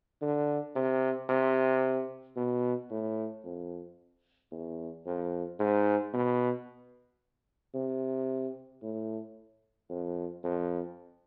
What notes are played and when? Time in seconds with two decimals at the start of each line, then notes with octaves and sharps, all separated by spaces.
0.21 D3
0.75 C3
1.29 C3
2.36 B2
2.90 A2
3.44 F2
4.51 E2
5.06 F2
5.59 G#2
6.13 B2
7.74 C3
8.82 A2
9.89 F2
10.43 F2